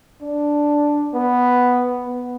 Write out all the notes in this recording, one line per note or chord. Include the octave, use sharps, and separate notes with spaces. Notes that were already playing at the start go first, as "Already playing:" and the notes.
D4
B3
B3